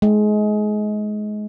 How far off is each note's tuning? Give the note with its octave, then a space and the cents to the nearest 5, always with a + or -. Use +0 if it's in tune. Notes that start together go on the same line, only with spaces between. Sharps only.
G#3 +25